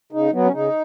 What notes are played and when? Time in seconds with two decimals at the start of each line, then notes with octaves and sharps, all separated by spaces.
0.12 C#3 D#4
0.32 F#3 B3
0.44 C#4
0.52 C#3 D#4